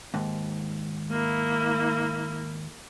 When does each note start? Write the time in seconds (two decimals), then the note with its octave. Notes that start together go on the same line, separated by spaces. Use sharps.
0.14 D#2 G#2
1.11 A#3 E4